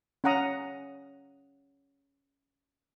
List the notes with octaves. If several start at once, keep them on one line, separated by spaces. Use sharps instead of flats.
C#4 F5 F#5 A#5 D#6